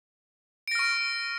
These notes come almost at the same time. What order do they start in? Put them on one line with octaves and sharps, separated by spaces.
D7 A#6 F6 C#6